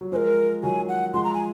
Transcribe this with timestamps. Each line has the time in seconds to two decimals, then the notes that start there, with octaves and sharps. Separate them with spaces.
0.01 F#3
0.12 F3 G#3 A#4 C5
0.63 D#3 F#3 G#5
0.88 F#5
1.14 F3 G#3 C6
1.24 A#5
1.34 G#5